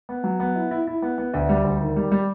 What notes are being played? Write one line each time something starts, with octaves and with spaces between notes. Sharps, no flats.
B3
F#3
B3
E4
E4
E4
B3
B3
D2
G3
D2
D#3
G3
G3